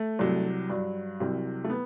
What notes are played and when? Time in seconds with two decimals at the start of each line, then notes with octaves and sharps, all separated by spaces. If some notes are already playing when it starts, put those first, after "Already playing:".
Already playing: A3
0.19 C2 C3 F#3
0.70 G2 F#3
1.20 C2 C3 F#3
1.64 A3
1.70 B3